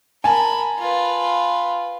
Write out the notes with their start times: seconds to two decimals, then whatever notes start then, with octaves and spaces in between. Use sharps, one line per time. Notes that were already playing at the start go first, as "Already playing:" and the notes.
0.24 A#4 G#5 A5 B5
0.79 F4 B4